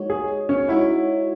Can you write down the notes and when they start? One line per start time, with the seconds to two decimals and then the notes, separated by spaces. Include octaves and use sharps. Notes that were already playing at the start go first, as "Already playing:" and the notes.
Already playing: G#3 D#4 F#4 C#5
0.10 G#4
0.49 C#4
0.68 G#3 D#4 E4 F#4 C#5